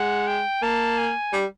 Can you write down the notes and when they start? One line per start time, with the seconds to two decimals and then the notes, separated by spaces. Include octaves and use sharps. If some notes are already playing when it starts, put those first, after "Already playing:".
Already playing: G#3 F#5
0.27 G5
0.62 A#3 A5
0.98 G#5
1.33 G3